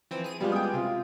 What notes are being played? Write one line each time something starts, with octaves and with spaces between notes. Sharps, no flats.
E3 F3 C4
G#4 D#7
G3 G#3 B3 F4 G4
G5 G#5 D#6
C3 F4